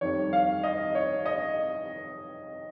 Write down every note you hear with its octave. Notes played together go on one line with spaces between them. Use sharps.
F2 D#3 G3 C#5
F5
D#5
C#5
D#5